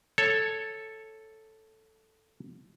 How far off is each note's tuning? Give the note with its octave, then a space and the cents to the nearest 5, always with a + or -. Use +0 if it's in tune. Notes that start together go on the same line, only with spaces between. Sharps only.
A4 +0 C#5 +0